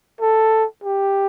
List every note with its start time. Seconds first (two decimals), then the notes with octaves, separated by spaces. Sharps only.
0.21 A4
0.84 G4